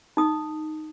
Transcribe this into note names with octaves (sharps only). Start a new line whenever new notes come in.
D#4 D#6